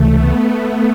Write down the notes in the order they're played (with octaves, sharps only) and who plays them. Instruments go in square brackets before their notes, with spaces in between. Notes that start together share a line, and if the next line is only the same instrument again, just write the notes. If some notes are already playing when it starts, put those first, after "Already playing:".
Already playing: [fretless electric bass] C#2 C3 E3 [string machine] A3
[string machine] B3